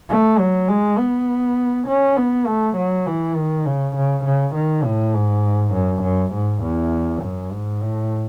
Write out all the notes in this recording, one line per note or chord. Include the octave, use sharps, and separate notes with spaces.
A3
F#3
G#3
B3
C#4
B3
A3
F#3
E3
D#3
C#3
C#3
C#3
D#3
A2
G#2
F#2
F#2
G#2
E2
F#2
G#2
A2